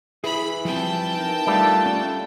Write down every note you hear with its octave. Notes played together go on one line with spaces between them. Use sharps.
E3 E4 G#4 B5
F3 G3 C4 G5 A5
D#4 A#4
G3 A3 D4 F4
C#4 A4